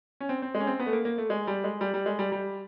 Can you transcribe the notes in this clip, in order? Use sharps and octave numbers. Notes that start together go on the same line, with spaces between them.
C#4
C4
C4
G#3
C#4
C4
B3
A3
A#3
A#3
A3
G#3
G3
G#3
G3
G3
G#3
G3
G3